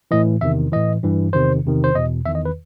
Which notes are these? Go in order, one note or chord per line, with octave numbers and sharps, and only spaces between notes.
A2 E3 D#5
E2 C3 D#3 E5
A2 E3 D#5
G2 E3
E2 C3 D#3 C5
E2 C3 D#3
C5
E2 B2 D#5
E2 D#3 E5
D#5
B4